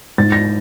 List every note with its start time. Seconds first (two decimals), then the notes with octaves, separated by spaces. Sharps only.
0.18 G#2 A6
0.32 A#6